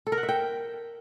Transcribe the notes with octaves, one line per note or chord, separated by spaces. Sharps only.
A4
A#4
F#5
E5
G5